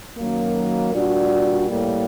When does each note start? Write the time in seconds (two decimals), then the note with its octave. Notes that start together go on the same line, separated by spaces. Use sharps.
0.17 F#2 D#3 F#3 A#3
0.93 A#2 G3 D4 F#4
1.69 A2 G3 A#3